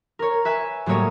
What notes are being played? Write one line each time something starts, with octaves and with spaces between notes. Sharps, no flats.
A#4 C#5
B4 E5 G#5
A2 F#3 G3 A#3 C#5 D#5